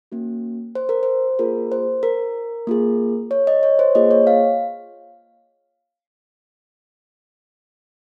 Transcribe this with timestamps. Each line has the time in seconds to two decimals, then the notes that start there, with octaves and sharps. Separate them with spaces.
0.12 A#3 C#4 F#4
0.75 C5
0.89 A#4
1.03 C5
1.39 A#3 F4 G#4 A#4
1.72 C5
2.03 A#4
2.67 A#3 F4 G#4
3.31 C#5
3.47 D#5
3.63 C#5
3.79 C5
3.95 A#3 F4 G#4 D#5
4.11 C#5
4.27 F5